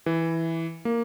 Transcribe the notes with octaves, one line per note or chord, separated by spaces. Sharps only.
E3
A#3